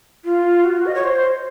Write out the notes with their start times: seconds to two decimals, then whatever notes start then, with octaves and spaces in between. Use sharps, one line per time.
0.24 F4
0.64 F#4
0.86 D#5
0.95 C#5
1.04 C5